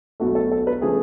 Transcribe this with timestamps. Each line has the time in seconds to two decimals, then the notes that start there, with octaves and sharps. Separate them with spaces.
0.20 B1 B2 A3 F#4
0.35 A4
0.52 A4
0.67 B4
0.82 C#3 F3 A3 G#4